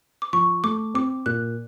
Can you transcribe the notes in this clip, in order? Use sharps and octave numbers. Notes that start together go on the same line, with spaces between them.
D6
F3 C#6
A3 D6
C4 D6
A#2 F#6